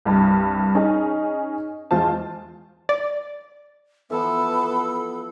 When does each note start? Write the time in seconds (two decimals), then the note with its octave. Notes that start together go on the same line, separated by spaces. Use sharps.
0.05 C2 G2
0.75 C#4 D#4 G#4
1.91 E2 G#3 F4 C5 A5
2.89 D5
4.10 E3 F3 B3 A4 A5